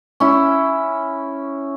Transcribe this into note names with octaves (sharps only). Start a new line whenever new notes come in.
C#4 E4